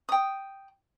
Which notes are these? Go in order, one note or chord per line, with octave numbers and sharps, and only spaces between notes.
G5 D#6